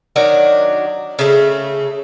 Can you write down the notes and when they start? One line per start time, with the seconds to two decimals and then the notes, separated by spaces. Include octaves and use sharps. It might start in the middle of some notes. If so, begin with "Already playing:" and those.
0.16 D#3 F#3 D4
1.19 C#3 A3